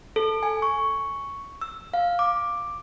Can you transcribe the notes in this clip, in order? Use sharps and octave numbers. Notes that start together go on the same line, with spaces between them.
A4
G#5
C#6
E6
F5
D6